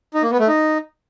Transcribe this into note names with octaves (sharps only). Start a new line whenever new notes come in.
D#4
A#3
B3
A3
D#4